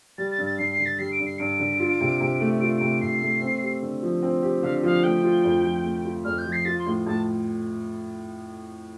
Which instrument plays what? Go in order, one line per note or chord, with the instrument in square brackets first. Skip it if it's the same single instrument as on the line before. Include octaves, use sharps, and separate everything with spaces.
[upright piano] G3 [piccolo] A6
[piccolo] A6
[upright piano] G2
[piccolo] A6
[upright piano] G2 [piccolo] C7
[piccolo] C7
[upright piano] D3
[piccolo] A6
[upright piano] G3 [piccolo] C7
[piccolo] D7
[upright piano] G2
[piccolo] C7
[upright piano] G2 [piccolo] D7
[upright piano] D3
F4
C3
C3
A3
[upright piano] F4 [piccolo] D7
[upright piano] C3 [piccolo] D7
[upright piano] C3 [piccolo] C7
[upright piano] A3
C4
G4
D3
F3
C4
G4
[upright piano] D3 [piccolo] F5
[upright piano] F3 [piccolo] F5
[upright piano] A3 [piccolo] G5
[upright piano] F4
F2
F3
A3
F4
[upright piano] F2 [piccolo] F6
[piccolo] G6
[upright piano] F3
[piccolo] C7
[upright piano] F4 [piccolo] A6
[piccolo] C6
[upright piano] A2
[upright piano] A2 [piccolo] A5